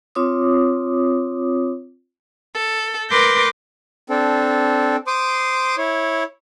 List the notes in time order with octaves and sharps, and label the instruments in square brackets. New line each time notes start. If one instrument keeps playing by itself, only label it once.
[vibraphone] C4 F4 C#5 D6 D#6
[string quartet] A4
A#4 B4 C6 D6 G6 A#6
[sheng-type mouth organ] C4 D4 A4
C5 C6 D6 D#6
E4 C#5